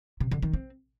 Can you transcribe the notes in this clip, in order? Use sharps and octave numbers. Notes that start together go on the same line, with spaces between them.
C3
D3
D#3
C4